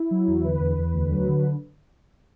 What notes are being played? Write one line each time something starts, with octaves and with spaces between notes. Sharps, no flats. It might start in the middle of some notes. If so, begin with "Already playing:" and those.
Already playing: E4
F#3
E2
D3 B4
E2
E2
D2
F#3
D3